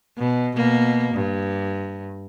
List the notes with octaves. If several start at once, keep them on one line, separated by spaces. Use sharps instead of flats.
B2
B2 A#3
G2